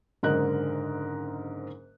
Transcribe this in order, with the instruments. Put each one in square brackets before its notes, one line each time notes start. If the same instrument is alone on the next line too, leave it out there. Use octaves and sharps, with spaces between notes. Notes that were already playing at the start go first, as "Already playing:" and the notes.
[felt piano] F#1 G#2 D3 A#4 D#5 F#6